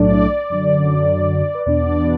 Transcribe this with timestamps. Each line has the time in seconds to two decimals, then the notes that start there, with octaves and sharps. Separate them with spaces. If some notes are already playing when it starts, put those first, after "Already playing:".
Already playing: B1 A2 F#3 A3 D4 D5
0.50 F#2 D3 F#3
1.55 B4
1.66 E2 B2 B3 D4 D5